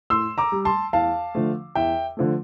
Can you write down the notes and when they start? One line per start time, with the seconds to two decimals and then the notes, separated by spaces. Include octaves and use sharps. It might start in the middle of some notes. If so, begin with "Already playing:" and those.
0.10 A2 C6 E6
0.38 A#5 D6
0.52 G3
0.65 A5 C6
0.93 E2 F5 A5
1.35 D3 F3 A3
1.75 E2 E5 G5
2.17 D3 F3 A3